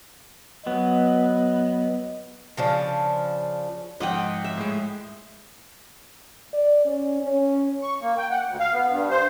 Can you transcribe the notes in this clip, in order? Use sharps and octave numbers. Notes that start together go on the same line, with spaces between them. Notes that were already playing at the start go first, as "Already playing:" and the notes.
F#3 B3 D#5
C#3 F3 D4
G#2 F3 D#5 F#5 G5
E5
A2 G#3
D5
C#4
C#4
C#6
A#3
G5
F#5
D2
F5
B3
G2
C5